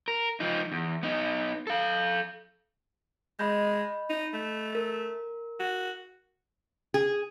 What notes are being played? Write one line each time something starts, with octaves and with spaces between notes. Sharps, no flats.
A#4
F3 D#4
E2
B3 D#4
A4 F5
G#3 D#5 B5 G6
D#4
A3
A#4
F#4
G#4